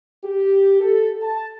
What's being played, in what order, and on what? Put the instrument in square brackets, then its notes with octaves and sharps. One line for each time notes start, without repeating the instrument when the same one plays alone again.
[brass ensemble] G4
A4
A5